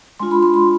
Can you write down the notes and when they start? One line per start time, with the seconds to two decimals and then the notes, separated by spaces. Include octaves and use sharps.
0.19 G#3 D4 F4 C6
0.31 B5
0.43 C6
0.54 B5